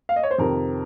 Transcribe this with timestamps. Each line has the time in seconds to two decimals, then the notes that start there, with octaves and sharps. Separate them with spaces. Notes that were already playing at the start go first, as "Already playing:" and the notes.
0.09 F5
0.16 D#5
0.23 C#5
0.31 C5
0.38 F2 C3 D#3 A#4